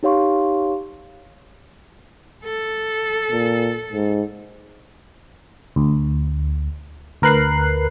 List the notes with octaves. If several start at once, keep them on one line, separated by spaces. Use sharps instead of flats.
D#4 G4 C#5 F5 C6 C#6
A4
A#2
G#2
D2
D2 A#4 B4 F#6 C7